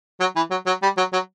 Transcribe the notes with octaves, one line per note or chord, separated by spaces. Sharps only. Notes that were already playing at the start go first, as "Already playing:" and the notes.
F#3
E3
F#3
F#3
G3
F#3
F#3